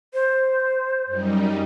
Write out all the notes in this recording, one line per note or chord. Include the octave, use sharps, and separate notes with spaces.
C5
F#2 G3 D#4